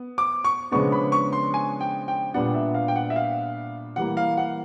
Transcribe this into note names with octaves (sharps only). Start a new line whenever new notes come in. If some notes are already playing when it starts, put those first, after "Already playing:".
Already playing: B3
D6
C#6
C#3 F3 G#3 B3 D4 C#6
B5
C#6
C6
G#5
G5
G5
A#2 G3 B3 D4 F#5
E5
F5
G5
F#5
E5
F5
E3 G3 A#3 F#5
F5
F#5